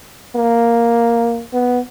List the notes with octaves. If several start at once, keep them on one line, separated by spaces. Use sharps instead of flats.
A#3
B3